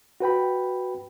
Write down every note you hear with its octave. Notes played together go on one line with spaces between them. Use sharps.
F#4 B4 G5 B5